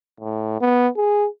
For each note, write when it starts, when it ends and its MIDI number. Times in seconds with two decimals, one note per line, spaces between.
0.21 0.61 45
0.61 0.88 59
0.97 1.27 68